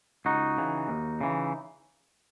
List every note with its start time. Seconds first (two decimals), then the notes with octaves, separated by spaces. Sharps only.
0.25 C#2 D#4 F#4
0.58 C#3 E3
0.88 D#2
1.21 C#3 E3